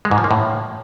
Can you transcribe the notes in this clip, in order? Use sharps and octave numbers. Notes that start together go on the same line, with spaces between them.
G#3
G#2
F3
A#3
A2